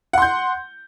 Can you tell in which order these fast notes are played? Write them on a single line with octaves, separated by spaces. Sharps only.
F#5 C6 G6